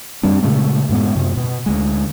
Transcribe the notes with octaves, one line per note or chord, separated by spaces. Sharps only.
F#2 G3 C4 D4
A#2 C#3 G#3 A3
F#2 A2 G#3 B3
F#2 C3
B2
D2 G#3